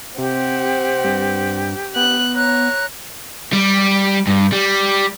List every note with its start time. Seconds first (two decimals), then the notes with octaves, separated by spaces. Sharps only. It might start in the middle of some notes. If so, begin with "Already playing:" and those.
0.18 C3 C4 G4 F#5
1.04 G2
1.96 B3 F#6
2.36 C#5 A#5 F#6
3.53 G3
4.27 G2
4.52 G3